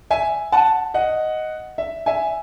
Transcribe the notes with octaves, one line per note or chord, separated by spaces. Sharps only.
E5 G#5
F#5 A5
D#5 F#5
E5
E5 G#5